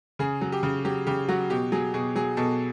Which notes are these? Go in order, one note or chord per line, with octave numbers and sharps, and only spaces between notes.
C#3 G#4
F#3
G4
C#3
F#3 G4
C#3 G4
F#3 F#4
B2 G4
F#3 G#4
B2 G#4
F#3 G#4
B2 A4